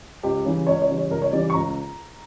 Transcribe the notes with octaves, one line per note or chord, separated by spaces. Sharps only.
C#2 G4
C#3 E3 G3
C#2 C#5
C#5
C#3 E3 G3
C#5
C#2 A#4
C#5
C#3 E3 G3 D5
C#6
C#2 A#5